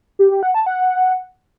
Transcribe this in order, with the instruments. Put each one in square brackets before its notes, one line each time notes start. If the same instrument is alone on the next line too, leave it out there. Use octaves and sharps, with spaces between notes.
[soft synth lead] G4
G4
F#5
A5
F#5